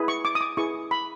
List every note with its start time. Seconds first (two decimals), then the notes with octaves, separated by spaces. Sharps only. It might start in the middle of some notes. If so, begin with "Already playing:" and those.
Already playing: E4 G#4 B4
0.08 C#6
0.25 D6
0.35 D#6
0.41 D6
0.57 E4 G#4 B4 C#6
0.91 B5